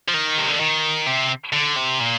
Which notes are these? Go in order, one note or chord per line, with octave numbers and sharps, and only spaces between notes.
F3
D#3
C3
D3
D#3
C3
D3
C3
A#2